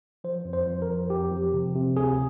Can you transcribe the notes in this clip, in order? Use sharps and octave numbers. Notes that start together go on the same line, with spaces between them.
F3 C5
F2
C5
F3
A#4
F2
F2 G4
F3
C3
C3
D2 G#4